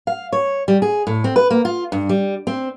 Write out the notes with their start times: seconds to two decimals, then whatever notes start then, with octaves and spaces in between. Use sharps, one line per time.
0.07 F5
0.33 C#5
0.68 G3
0.82 G#4
1.07 A2
1.24 C4
1.36 B4
1.50 A#3
1.65 F4
1.92 G2
2.09 G3
2.47 C4